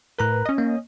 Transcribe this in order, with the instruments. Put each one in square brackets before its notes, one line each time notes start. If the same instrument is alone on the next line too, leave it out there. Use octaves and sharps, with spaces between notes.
[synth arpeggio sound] A2 B4 [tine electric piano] A#4 A#5 F#6
[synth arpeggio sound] C#4 D#5
[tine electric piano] A#3